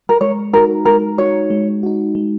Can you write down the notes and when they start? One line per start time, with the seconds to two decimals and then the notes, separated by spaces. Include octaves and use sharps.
0.09 A#4
0.21 G#3 C#5
0.53 D#4 F#4 A#4
0.85 G#3 A#4
1.18 D#4 F#4 C#5
1.50 G#3
1.83 D#4 F#4
2.15 G#3